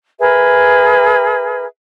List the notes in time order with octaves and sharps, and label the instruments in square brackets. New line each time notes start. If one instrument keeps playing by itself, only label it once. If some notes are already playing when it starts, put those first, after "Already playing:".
[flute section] G#4 A#4 B4 E5